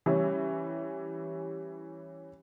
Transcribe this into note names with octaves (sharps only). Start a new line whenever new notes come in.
E3 G3 C#4